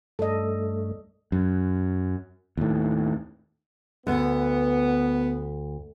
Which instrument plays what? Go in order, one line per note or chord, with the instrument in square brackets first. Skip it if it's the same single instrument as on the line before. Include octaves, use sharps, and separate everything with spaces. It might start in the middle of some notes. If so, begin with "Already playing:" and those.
[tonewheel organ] G2 A3 [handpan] A4 D5 D#5
[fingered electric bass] F#2
D#2 A2
[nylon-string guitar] D2 [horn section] B3